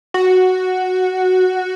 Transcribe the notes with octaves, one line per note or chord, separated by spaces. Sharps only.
F#4